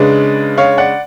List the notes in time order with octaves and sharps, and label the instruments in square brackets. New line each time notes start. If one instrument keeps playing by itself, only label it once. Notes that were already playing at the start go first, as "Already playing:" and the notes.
Already playing: [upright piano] C#3 G#3 D4 B4 D5
C#5 F5
D5 F#5